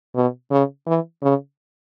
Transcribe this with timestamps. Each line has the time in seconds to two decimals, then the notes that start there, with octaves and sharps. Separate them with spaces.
0.15 B2
0.51 C#3
0.87 E3
1.22 C#3